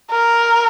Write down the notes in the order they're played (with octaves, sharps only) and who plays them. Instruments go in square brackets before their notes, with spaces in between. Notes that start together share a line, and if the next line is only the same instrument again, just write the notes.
[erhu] A#4